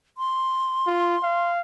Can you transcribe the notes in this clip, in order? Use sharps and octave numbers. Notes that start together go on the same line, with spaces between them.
C6
F4
F5